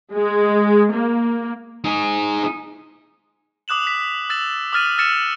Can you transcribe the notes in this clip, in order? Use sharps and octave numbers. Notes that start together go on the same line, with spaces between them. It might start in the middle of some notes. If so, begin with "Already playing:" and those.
G#3
A#3
D#4 G#4
D6 D#6 F#6 E7 F#7
B6
E6 A6 E7 F#7
D6 D#6 F6 A6 D#7
E6 F6 A6 C#7 E7